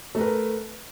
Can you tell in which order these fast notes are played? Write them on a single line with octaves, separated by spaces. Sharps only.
A3 A#4 B4